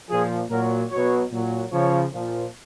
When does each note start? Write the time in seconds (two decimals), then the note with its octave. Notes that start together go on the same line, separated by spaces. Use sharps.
0.09 A#2 F3 G#4
0.50 A#2 F#3 A#4
0.90 B2 F#3 C#5
1.31 A#2 F#3
1.71 C#3 F3 C#5
2.12 A#2 F3